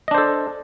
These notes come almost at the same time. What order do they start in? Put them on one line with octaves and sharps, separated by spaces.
D#5 D4 C5 A4